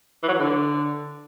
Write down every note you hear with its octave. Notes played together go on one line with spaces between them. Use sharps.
E3
F#3
E3
D3